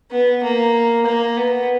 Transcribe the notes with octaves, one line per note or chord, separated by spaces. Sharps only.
B3
A#3
A#3
B3